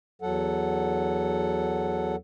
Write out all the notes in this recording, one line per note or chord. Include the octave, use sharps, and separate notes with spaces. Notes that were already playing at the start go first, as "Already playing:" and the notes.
E2 F#3 A4 F#5